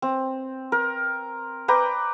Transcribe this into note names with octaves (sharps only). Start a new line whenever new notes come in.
C4
A#4
B4 D5 G5 A#5